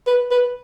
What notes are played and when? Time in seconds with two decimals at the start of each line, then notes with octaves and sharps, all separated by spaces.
0.07 B4
0.31 B4